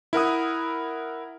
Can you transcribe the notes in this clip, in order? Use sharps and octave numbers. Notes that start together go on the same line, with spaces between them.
E4 A#4 F#5 D#6